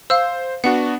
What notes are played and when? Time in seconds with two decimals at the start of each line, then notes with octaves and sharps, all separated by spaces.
0.10 C5 F5 E6
0.64 B3 D4 F#4 F#5